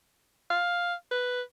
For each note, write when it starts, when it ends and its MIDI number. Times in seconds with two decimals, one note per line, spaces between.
0.50 0.94 77
1.11 1.42 71